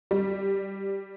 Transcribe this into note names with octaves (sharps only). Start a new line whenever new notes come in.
G3